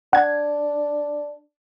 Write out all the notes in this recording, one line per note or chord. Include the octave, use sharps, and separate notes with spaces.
D4 F#5 G#6